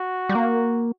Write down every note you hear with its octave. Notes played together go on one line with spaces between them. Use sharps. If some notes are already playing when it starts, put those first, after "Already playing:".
Already playing: F#4
G3
A#3